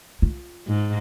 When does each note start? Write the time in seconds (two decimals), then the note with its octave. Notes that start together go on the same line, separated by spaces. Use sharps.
0.22 F4
0.67 G#2